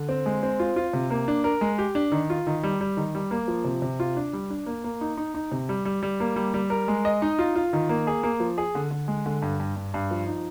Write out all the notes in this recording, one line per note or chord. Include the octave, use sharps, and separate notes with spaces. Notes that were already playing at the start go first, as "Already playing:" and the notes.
Already playing: D3
C4
G#3
C4
F4
F4
C3
A#3
D4
A#4
G#3
G4
D4
D#3
F4
D#3
G3
G3
D#3
G3
A#3
F3
C3
C3
F4
D4
G3
D4
A#3
A#3
D#4
D#4
D#4
C3
G3
G3
G3
A#3
G3
G3
A#4
G#3
D#5
D#4
F4
F4
D#3
A#3
G#4
A#3
F3
G#4
D3
D3
G#3
D3
G2
G2
G2
G2
F3
D#4